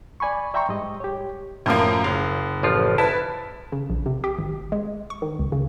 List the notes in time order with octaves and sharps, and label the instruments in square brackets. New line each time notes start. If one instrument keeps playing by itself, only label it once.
[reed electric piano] D5 G#5 B5 C#6
D5 E5 G5 A#5 C6 C#6
G#2 G3 D#5
G4 C#5
[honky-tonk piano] F#2 A#3 [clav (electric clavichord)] A2 F3
[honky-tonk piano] F#1 [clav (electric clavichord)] F5
[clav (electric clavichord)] A1 F3 F4
[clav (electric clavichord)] E4 [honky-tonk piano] B4 A5
[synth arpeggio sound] C#3
A#1
C3
G4
G#1
G#3
C#6
D#3
C#2
C#3